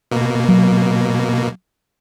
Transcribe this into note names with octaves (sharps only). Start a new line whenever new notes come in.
B2 A#3
F#3